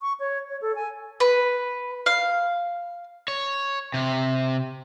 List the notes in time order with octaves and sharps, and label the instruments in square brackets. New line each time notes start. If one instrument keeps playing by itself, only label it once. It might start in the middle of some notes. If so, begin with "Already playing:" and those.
[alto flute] C#6
C#5
C#5
A4
G#5
[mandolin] B4
F5
[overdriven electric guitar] C#5
C3